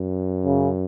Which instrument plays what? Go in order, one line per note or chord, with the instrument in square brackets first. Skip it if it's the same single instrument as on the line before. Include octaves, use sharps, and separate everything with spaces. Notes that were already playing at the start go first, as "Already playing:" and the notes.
Already playing: [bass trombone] F#2
[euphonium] C#3